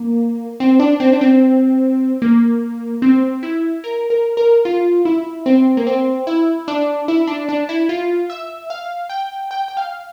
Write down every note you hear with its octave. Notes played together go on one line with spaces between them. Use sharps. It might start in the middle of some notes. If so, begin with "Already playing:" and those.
Already playing: A#3
C4
D4
C4
D4
C4
A#3
C4
E4
A#4
A#4
A#4
F4
E4
C4
A#3
C4
E4
D4
E4
D4
D4
E4
F4
E5
F5
G5
G5
G5
F5